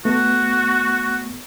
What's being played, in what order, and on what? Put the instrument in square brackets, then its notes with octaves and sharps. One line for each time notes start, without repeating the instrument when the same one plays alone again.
[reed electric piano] A3 B3 [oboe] F#4